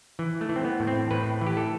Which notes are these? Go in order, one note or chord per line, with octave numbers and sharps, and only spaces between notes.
E3
A3
E3
C4
B3
A2
C4
A2 B4
E3
G4
A4